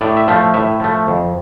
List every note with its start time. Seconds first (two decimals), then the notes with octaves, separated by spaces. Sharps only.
0.01 A2 D5
0.17 E5
0.28 F3 A3 F5
0.54 A2 E5
0.80 F3 A3
1.07 F2